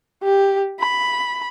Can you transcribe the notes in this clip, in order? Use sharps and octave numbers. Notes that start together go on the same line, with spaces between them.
G4
B5